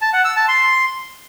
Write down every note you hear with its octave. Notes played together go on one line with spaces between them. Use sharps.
A5
F#5
E6
A5
C6